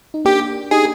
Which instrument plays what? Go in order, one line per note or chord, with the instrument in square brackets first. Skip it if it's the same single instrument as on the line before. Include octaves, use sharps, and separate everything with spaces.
[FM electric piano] D#4
[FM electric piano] A#3 D4 [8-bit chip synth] G4
[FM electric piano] D#4 G4 [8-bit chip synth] G#4